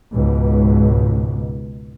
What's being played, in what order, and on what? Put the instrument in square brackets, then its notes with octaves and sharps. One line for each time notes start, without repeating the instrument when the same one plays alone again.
[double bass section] C#2 G#2 B2